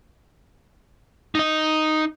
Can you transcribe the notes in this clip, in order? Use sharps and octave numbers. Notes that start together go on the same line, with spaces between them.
D#4 D#5